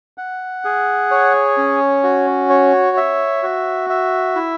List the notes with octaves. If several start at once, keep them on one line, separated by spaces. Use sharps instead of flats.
F#5
G#4
C#5
C#4
F#4
C#5
E5
F#4
E5
E4